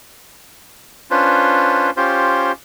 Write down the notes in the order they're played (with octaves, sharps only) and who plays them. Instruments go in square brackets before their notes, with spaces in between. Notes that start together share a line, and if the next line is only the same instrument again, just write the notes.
[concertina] C#4 D4 F4 B4 C5
C#4 F4 G4 C5